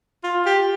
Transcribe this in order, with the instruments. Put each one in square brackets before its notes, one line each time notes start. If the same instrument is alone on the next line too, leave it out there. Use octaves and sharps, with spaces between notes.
[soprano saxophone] F4
G4